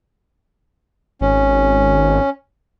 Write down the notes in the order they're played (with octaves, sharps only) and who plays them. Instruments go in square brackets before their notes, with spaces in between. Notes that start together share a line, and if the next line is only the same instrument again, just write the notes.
[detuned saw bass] G#1 [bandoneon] C#4